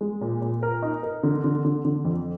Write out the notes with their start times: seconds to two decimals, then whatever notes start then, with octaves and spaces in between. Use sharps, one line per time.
0.01 G#3
0.21 A#2
0.42 A#2
0.63 A#4
0.82 D#4
1.03 A#4
1.23 D3
1.44 D3
1.65 D3
1.85 D3
2.05 F2